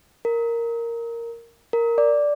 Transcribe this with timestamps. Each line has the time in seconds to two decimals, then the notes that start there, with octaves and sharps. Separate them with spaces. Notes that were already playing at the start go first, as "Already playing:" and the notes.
0.25 A#4
1.73 A#4
1.98 D5